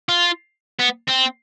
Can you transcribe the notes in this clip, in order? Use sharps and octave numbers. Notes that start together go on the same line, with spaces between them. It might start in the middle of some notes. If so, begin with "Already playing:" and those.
F4
B3
C4